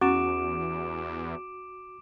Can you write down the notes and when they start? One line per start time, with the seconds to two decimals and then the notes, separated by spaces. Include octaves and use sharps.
0.01 E2 C#4 F#4 D6 D7 E7